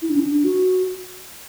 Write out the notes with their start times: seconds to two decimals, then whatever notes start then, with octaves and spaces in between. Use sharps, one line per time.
0.02 E4
0.10 D4
0.16 C#4
0.24 D4
0.44 F#4